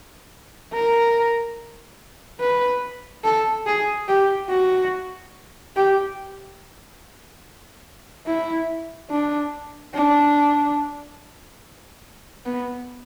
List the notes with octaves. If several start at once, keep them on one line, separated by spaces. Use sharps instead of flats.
A#4
B4
A4
G#4
G4
F#4
G4
E4
D4
D4
B3